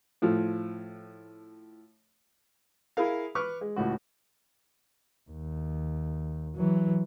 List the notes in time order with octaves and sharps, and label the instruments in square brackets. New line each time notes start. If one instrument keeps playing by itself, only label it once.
[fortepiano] A2 F3
E4 G#4 A#4 F5
B4 C#6 D6 F6
G#3
C#2 A2 F#4
[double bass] D#2
E3 F#3